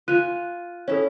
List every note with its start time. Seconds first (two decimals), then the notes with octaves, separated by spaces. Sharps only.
0.08 F4 G#5 F#6 D#7
0.88 C#4 E4 A4 C#5